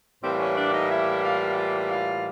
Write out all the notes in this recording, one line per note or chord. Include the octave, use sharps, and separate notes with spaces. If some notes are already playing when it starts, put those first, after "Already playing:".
A2 E3 G3 A#3 C4 C5
C#4 C#5
D4 D5
D#4 D#5
E4 E5
F4 F5
F4 F5
F4 F5